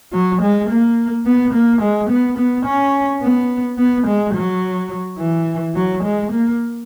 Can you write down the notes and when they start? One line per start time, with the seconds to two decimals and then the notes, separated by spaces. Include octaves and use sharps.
0.13 F#3
0.42 G#3
0.69 A#3
1.26 B3
1.53 A#3
1.82 G#3
2.10 B3
2.38 B3
2.66 C#4
3.22 B3
3.78 B3
4.07 G#3
4.34 F#3
5.19 E3
5.75 F#3
6.04 G#3
6.32 A#3